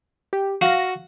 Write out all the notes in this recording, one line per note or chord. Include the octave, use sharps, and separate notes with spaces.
G4
F#4 F5 A#6